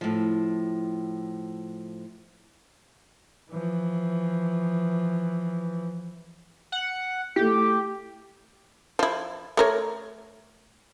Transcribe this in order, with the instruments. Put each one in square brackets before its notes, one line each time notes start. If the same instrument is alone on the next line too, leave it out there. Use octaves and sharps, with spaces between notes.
[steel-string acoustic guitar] A2 F3
[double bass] E3 F3
[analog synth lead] F#5
[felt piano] A3 E4 [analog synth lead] G4
[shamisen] F3 E4
A3 A#4 C#5